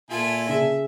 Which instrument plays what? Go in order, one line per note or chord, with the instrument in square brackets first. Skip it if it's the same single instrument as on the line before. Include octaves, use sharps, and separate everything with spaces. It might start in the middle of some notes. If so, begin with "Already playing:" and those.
[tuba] A#2 [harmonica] E4 A4 G#5 [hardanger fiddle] F4
[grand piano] C#3 G#4 [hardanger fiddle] E5